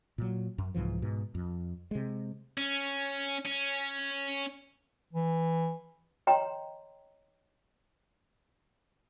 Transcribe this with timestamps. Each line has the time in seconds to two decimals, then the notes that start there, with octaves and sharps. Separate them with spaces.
0.18 A#2 F#3
0.58 F#2
0.75 C2 G#2 E3 F3
1.02 G#2 B2
1.35 F2
1.91 C3 G#3
2.58 C#4
3.45 C#4
5.13 E3
6.27 C#5 D#5 G5 A#5 C6